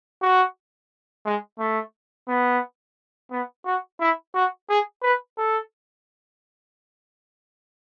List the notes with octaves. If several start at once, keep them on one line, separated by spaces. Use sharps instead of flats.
F#4
G#3
A3
B3
B3
F#4
E4
F#4
G#4
B4
A4